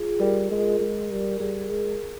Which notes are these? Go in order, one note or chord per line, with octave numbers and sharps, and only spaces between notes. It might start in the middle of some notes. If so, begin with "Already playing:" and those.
Already playing: F4 G#4
G3 A#4
G#3
G#3
G3
G3 G#4
G#3